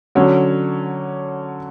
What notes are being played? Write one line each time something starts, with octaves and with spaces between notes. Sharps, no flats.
D3 F#3 C#4